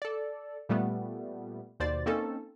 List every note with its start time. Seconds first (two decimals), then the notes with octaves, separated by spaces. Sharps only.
0.02 A4 D5
0.69 A#2 G3 A3 B3
1.80 D#2 B2 C5 D5 A6
2.06 A#3 C4 C#4 D#4 A4